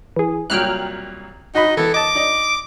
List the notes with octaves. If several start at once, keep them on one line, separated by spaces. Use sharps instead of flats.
E3 G#4
C2 A#2 F#3 G5 F6 F#6
D#4 F#4 D#5 B5
E3 B3 A4
D#5 A5 D6
D#4 D5 D#5